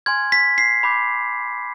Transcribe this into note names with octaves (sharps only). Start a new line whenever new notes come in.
G#5 C6 F6 G#6
B6
C7
B5 D6 G6